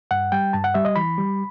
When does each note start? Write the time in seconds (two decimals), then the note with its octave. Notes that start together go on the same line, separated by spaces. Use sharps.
0.11 G2 F#5
0.32 G3 G5
0.53 G2 A5
0.64 F#5
0.74 G3 E5
0.85 D#5
0.96 E3 B5
1.18 G3